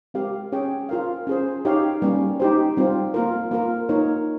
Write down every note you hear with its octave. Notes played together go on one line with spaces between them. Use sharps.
G#3 C4 G4 A#4 F5
C#4 G#4 C#5 G5
F4 A#4 F5
C#4 G#4 C5
D#4 G4 C#5 F5
G3 A#3 C#4
D#4 G4 C5
G3 C4 F4
A#3 F4 A#4
A#3 F4 A#4
A#3 D#4 A#4 C#5